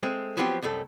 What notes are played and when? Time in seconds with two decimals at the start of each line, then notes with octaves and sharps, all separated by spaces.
0.03 G#3 A3 C4
0.37 F3 F#3 B3 C4 F4 G4
0.62 C2 F#2 A3 A4